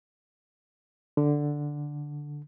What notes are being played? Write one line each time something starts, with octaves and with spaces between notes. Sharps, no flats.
D3